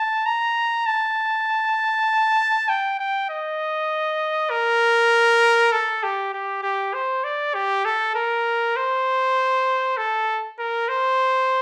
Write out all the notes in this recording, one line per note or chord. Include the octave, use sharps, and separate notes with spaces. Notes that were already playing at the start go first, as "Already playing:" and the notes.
Already playing: A5
A#5
A5
G5
G5
D#5
A#4
A4
G4
G4
G4
C5
D5
G4
A4
A#4
C5
A4
A#4
C5